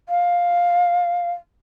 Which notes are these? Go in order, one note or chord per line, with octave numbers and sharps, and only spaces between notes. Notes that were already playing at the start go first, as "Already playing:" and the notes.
F5